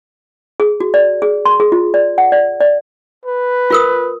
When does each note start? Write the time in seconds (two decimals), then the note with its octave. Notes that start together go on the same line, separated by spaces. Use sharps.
0.60 G#4
0.80 F#4
0.94 D5
1.22 G#4
1.46 C6
1.60 G#4
1.72 F4
1.94 D5
2.18 F#5
2.32 D5
2.61 D5
3.25 B4
3.70 F4 A#4 D#6